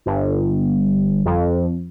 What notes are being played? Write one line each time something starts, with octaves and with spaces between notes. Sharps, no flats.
G1
F2